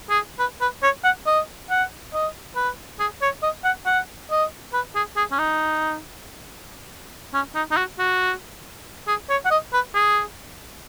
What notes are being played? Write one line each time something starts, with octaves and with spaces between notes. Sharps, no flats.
G#4
B4
B4
C#5
F#5
D#5
F#5
D#5
B4
G#4
C#5
D#5
F#5
F#5
D#5
B4
G#4
G#4
C#4
D#4
C#4
D#4
D#4
F#4
F#4
G#4
C#5
F#5
D#5
B4
G#4